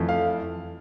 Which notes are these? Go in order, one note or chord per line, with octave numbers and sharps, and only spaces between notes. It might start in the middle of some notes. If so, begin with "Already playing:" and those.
Already playing: F2 E3 A3
F5